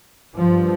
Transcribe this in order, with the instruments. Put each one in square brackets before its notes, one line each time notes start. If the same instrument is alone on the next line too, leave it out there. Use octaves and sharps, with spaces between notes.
[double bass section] G2 F3